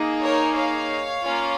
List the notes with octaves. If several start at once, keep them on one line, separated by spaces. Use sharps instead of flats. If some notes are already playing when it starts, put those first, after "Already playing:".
Already playing: A#3 D#4 G#4
A#4 C#5
C#5 F5
A#3 C#4 F4